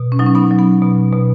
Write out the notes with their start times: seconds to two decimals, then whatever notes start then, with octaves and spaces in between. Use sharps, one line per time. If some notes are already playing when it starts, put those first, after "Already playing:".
Already playing: B2
0.12 C#4
0.19 F#3 D#4
0.26 C#4
0.35 B3 D#4
0.51 F#3
0.59 B3
0.82 B2
1.13 B2